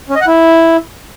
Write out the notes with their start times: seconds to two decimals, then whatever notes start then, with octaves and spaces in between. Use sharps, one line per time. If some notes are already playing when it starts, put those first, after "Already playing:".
0.09 C#4
0.15 D#5
0.21 F#5
0.27 E4